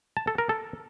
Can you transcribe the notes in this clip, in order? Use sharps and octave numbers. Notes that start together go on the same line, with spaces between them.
A5
A4
A#4
A4